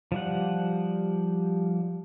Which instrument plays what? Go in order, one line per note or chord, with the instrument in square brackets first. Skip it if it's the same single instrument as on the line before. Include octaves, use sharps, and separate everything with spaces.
[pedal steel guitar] F3 G3 F#5